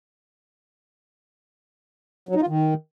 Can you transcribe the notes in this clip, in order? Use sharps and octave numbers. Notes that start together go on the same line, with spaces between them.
F#3
D#4
F4
D#3